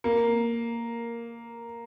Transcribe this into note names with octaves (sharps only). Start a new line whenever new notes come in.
A#3